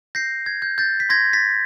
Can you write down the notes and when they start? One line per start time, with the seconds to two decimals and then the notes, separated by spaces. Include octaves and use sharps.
0.15 G6 A#6 C7
0.46 G#6
0.62 G6
0.78 G6 A6
1.00 B6
1.09 C6 G#6 A#6
1.33 A6 B6